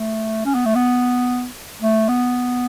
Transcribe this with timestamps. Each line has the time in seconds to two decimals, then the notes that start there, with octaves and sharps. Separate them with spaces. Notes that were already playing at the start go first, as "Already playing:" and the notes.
Already playing: A3
0.46 C#4
0.55 B3
0.66 A3
0.75 B3
1.82 A3
2.09 B3